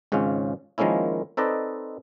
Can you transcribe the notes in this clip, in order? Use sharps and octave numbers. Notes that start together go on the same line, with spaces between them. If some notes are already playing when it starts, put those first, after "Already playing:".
G#1 G#2 C#3 C#4 F4
D#3 F3 G#3 A#3 C#4 E4
C4 D#4 A4 B4 D5 D#5